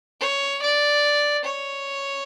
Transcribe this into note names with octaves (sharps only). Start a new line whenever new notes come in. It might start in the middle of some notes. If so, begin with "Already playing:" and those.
C#5
D5
C#5